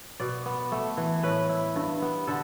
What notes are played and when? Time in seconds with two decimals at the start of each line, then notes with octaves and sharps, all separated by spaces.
0.20 B2 D5
0.46 B3
0.72 A3
0.97 E3
1.23 A2 B4
1.49 E4
1.76 G2
2.02 B3
2.27 D3 A4